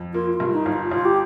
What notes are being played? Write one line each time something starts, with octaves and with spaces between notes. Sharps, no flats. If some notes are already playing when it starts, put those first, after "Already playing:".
Already playing: F2
A#3 F4
F4
G2
D#4
G1
F4
G1 F4
G4